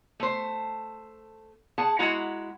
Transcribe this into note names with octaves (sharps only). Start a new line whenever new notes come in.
A3 C5
G#4 F#5 A5
G#3 E4 F#4 F#5 A#5